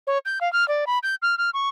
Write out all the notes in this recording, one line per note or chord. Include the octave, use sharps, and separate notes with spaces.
C#5
G6
F5
F6
D5
B5
G6
F6
F6
C#6